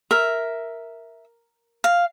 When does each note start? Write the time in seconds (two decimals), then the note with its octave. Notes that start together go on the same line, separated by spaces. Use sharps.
0.11 A#4 E5
1.84 F5